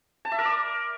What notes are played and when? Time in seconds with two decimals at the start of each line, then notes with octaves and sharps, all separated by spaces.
0.25 A5
0.32 E5
0.38 A#4
0.45 D5